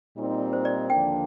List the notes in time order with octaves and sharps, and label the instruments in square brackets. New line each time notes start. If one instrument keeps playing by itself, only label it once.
[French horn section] A#2 G3 C4 D#4
[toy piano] C5
D5
[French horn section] D#2 D3 F3 A#3 D4 [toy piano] G5